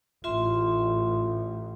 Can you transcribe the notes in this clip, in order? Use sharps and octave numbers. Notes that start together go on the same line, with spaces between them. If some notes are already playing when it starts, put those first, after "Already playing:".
A1 F4 E5 C6